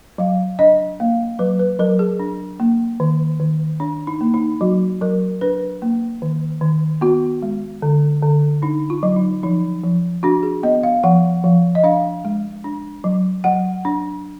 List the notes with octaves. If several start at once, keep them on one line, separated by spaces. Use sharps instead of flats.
F#3 F5
D4 D#5
A#3 F5
F#3 B4
B4
F#3 A#4
G#4
D4
A#3
D#3
D#3
D4
D#4
A#3
D#4
F#3 F#4
F#3 A#4
D4 B4
A#3
D#3
D#3
B3 F#4
G#3
D3
D3
D4 D#4
F4
F#3
D#4
F3 D#4
F3
D4 F#4
G#4
B3 D#5
F5
F3 F#5
F3 F5
D#5
D4 F5
G#3
D4
F#3
F#3 F#5
D4